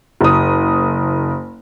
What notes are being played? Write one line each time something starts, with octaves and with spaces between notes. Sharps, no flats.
F#1 D#6